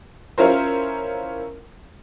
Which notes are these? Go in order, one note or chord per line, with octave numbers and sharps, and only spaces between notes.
C#4 E4 F4 A#4 C5